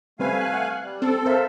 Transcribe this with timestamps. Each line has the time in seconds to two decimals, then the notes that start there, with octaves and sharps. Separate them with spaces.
0.19 G3 A3 C4 B4 F5 G#5
0.41 F#6
0.54 F#5
0.83 G3
1.02 C4 A4
1.26 A#4 C5 E5 F5